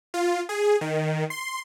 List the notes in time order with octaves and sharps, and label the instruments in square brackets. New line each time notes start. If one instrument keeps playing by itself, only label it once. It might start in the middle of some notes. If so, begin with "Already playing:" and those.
[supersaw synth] F4
G#4
D#3
C6